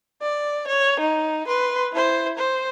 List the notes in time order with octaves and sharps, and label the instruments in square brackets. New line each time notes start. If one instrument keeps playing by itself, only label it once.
[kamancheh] D5
C#5
D#4
B4 C6
E4 C5
C5